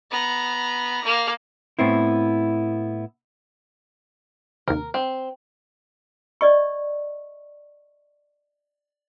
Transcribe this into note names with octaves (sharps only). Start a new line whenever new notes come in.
B3 A#5
A#3
A2 B3 C4 E4
D#2 C3 A#4
C4
D5 D#5 C#6